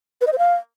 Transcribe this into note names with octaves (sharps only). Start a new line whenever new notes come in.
B4
D#5
C5
F5